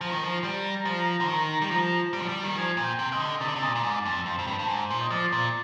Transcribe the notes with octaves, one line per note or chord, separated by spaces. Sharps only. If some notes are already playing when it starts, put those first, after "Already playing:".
F3 A#5
D#3
F3
G3
F3
D3
D#3
G3
F3
G3
F3
G3
D#3
F3 G#5
A#2
G5
C3
C3 D#5
D3
C3 D5
D3
C3 D#5
A#2 D5
A#2
G#2
F2
F2 C5
F2
G2
G2
G#2
A#2
D#5
F3 D5
A#2